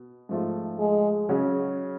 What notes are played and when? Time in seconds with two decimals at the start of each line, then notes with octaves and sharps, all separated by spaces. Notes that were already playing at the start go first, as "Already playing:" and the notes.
Already playing: B2
0.29 G#2 F3 A3 F4
0.79 G#3
1.29 C#3 F#3 C#4 F#4